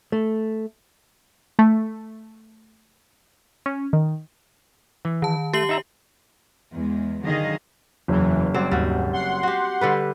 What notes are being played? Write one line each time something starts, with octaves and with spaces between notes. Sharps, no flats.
A3
A3
C#4
D#3
E3
D#3 A5
A3 G4 C7 F#7
D#4 E5 A#5
E2 G#3
D3 D#3 F#3 G#4 D#5 F5
F#1 E2 E3
F#3 G3 C4 D5
D#2 G#2 G3 F#4
F#5 C6
F#4 G4
D3 G3 B4